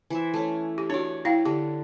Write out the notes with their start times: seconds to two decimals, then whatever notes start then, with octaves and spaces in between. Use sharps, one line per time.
0.10 E3 C5 E5
0.34 A3 C#4
0.78 G4
0.90 D4 F#4 C#5 D5
1.25 E4 F5 G5
1.45 D3 G4